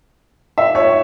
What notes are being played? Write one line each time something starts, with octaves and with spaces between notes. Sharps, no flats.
E5
C#5